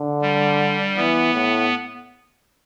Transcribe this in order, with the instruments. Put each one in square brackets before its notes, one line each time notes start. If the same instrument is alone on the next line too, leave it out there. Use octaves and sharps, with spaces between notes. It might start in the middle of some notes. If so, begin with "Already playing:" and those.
Already playing: [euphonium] D3
[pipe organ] G3
[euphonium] E3 [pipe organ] B3
[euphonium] A2